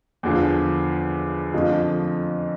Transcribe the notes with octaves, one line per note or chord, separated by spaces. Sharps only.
E2 D3 F3
F2 D3 F3 A3